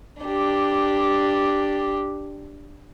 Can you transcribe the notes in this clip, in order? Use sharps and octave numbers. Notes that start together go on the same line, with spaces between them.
D4 G4